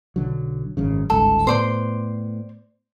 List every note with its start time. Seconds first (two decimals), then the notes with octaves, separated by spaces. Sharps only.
0.16 B1 D3 F#3
0.77 G#1 F#2 C#3
1.10 G1 C#2 G#2 A4
1.47 A2 B3 C5 D5 C6